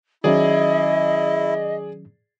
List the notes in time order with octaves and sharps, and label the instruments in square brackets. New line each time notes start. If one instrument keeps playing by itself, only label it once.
[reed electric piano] D#3 F#3 C#4 [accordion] E4 [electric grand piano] G#4 D5 [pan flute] D#5